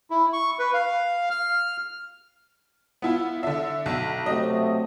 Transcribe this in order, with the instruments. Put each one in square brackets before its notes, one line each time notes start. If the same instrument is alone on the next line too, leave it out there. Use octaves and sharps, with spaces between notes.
[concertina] E4
C#6
B4
F5
F6
[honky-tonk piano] B3 E4 F4
D3 E5
B1
[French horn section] C3 F#3 A3 [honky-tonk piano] D#5